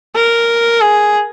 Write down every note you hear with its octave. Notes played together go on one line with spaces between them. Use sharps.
A#4
G#4